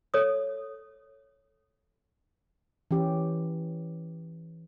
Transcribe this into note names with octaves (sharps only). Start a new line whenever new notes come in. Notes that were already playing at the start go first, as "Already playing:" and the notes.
A4 C#5 D#6
E3 C#4 G4